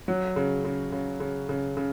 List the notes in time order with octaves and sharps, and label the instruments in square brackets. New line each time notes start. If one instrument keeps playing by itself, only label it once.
[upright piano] F#3
C#3
C#3
C#3
C#3
C#3
C#3